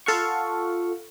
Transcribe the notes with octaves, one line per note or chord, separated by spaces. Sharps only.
F4 A4 F5 F#5 C#6